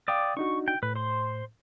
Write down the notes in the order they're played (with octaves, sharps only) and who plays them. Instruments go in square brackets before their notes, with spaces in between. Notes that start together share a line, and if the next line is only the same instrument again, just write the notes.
[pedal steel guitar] D5 D6 [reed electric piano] F5 G5 D#6
[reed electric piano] D4 D#4 F#4 [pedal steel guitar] C#6
[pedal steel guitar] G5
[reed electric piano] A2 [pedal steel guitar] B4
[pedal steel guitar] C5 C6